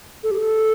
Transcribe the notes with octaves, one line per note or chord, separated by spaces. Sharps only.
A4
G4
A4